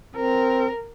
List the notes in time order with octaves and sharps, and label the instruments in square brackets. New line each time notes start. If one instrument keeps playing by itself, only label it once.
[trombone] C4 [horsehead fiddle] A#4